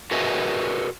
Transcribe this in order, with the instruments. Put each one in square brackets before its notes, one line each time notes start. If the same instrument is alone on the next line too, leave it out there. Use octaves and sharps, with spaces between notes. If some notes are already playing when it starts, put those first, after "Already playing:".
[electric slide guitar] F#4 G#4 A#4 B4 D#5 E5